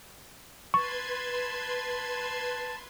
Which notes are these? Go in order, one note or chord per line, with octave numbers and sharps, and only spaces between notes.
B4 A5 C6 C#6 G#6